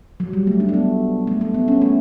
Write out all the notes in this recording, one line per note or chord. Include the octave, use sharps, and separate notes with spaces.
F#3
G3
A3
D4
A3
B3
A3
A3
B3
C#4
A3